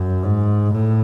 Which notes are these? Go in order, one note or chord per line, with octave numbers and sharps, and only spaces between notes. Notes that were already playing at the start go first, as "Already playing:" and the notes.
Already playing: F#2
G#2
A2